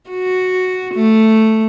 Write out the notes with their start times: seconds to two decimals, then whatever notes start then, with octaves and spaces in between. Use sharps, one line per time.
0.10 F#4
0.95 A3